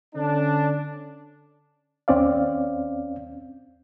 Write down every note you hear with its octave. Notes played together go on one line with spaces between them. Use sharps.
D3 C#4 D4
D#2 C4 C#4 D5 F5